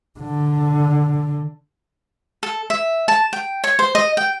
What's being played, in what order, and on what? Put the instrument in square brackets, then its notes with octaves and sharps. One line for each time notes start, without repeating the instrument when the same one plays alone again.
[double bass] D3
[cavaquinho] A4
E5
A5
G5
C#5
C5
D#5
G5